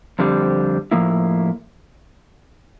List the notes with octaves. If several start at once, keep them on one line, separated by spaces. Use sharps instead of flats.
F2 D3 G3 C4
A2 F3 A#3 E4